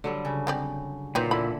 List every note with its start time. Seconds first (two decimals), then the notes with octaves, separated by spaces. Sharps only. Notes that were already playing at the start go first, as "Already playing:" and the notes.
0.04 D3 F#3 G3
0.25 C#3
0.47 C4 G4 D5
1.15 A#2 F#3 C4 D#4 B4
1.31 D3 E3 E4 B5